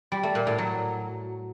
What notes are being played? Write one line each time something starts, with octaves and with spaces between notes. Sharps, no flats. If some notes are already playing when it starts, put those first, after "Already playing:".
G3
A3
A#2
A2
F#3